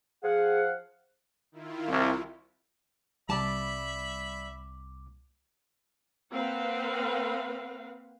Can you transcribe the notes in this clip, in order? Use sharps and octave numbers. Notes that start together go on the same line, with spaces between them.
F3 G#4 F5 F#5
D#3 E4 F4
C2
C2 G3 E5 A5 B5 D6
A#3 C4 B4 F5 F#5